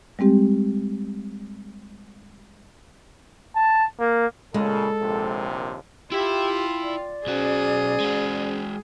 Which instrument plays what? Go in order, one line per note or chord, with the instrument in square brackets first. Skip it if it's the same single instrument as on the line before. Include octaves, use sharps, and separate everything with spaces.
[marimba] G3 G#3 C4 G4
[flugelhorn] A5
A#3
[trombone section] A#2 C#3 [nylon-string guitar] G#3 [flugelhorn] A4
[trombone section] A#1 D#2 C3
[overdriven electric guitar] E4 E5 [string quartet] F4 [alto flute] G4 [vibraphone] G5
[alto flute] D5
[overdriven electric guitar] B1 F#4 [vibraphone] C#4 C5 [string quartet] G#4
[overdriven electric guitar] G#3 F#4